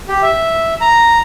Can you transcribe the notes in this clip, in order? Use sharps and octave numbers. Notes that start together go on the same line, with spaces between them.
G4
E5
A#5